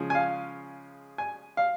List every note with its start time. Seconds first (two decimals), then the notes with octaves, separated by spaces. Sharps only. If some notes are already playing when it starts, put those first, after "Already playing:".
Already playing: C#3 F3 G#3
0.10 G#5
0.15 F5
1.18 G#5
1.57 F5